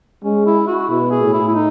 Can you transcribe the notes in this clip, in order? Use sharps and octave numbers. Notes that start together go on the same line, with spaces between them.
G#3 C#4
E4
F#4
B2 E4
G#4
A2
E4
E4
D#4